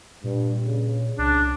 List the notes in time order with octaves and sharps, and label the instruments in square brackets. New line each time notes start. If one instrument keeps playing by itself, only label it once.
[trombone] G2 [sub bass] A#2
[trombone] C#3
[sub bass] C2 [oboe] D4